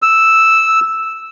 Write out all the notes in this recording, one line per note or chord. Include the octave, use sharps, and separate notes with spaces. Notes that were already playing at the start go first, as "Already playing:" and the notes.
E6